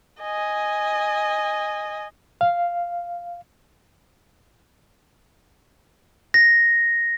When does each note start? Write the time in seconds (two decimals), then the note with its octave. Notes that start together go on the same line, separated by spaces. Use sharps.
0.21 D#5 G#5
2.41 F5
6.34 A#6